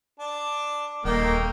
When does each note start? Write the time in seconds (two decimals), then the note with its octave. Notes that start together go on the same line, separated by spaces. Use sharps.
0.19 D4 A5
1.05 D#1 A3 A#3 D#4 G5